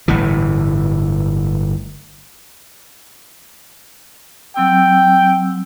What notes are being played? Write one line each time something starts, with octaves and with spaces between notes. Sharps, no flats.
G1 A2 E3
F#3 C4 G5 E6